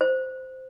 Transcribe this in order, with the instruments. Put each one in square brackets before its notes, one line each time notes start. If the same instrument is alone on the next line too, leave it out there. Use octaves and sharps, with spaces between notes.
[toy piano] C5